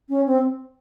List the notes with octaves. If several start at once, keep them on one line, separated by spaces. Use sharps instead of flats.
C#4
C4